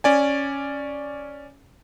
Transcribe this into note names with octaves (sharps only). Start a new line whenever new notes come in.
C#4 D5 G#5